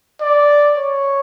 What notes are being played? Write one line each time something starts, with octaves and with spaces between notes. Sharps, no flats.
D5
C#5